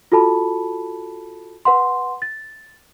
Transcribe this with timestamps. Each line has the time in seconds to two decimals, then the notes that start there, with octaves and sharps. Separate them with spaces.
0.12 F4 F#4 A4 A5 B5
1.65 B4 F#5 C6
2.22 A6